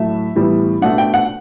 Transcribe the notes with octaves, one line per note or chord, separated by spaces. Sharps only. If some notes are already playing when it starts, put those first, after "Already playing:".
Already playing: A2 F#3 A3 E5
A2 E3 G3 B3
B2 A3 D4 F#5
G5
F#5